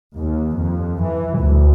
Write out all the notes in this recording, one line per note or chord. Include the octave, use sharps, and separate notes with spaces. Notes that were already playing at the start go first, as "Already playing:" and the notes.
D#2
F2
E3
D2